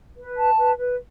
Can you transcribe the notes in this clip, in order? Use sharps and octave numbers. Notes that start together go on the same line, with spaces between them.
B4
A5
B4
B4